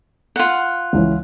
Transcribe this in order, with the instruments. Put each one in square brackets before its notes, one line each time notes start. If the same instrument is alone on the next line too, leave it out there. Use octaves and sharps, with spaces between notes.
[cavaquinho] F4 F#5
[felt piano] C#2 E3 C#5